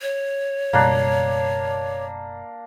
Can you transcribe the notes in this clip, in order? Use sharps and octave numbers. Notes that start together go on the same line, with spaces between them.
C#5
F#1 B2 G3 A#3 D4